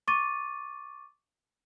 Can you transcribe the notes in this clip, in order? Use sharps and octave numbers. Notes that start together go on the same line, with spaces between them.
C#6 D6 A6 D#7